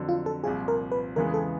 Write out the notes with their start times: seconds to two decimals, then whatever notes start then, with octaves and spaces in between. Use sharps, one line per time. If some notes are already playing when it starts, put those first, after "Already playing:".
Already playing: F2 D3 F#3
0.09 F4
0.26 A4
0.44 C2 A#2 F3 G#4
0.68 A#4
0.92 B4
1.16 E2 C#3 E3 G#3 B3 A#4
1.34 A4